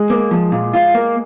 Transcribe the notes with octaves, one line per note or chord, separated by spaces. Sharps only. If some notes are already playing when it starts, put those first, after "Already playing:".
Already playing: G#3 G#4
A#3
F3
A#2
F4
A#3